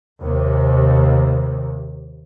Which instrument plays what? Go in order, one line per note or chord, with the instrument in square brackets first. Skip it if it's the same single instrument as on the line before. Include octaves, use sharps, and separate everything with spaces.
[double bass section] D#2 C3